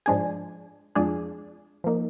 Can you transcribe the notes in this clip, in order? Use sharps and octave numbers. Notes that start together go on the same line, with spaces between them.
G#2 F3 G#3 D4 G#4
F2 F3 G#3 D4 G#4
F3 A#3 D#4